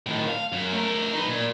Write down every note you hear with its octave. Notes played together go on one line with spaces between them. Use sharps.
A2 D#3
F5
F#2
A3 A#4
D#4 B4
A#2